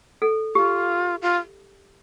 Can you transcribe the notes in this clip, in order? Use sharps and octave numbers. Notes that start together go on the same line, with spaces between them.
A4
F4 G4
F4